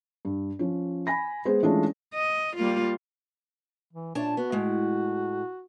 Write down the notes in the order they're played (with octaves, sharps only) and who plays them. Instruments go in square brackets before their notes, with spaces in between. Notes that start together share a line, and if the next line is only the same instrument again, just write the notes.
[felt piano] G2
F3 C#4
G#5 B5 A#6
G#3 B3 G#4 C5
E3 G#3 A3 C#4 D4 F4
[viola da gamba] D#5
G3 A#3 F4
[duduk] E3
[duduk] A#2 [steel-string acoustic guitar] D4 C#5 A5
[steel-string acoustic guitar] B3 [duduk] F#4
[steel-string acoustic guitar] A2 G#3